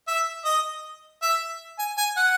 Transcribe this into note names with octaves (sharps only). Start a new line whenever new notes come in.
E5
D#5
E5
G#5
G#5
F#5